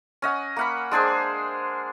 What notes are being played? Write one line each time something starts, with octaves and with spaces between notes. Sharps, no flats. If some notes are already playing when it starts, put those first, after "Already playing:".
C#4 D#5 F#5
A#3 F#5 B5
G#3 D4 G#4 C5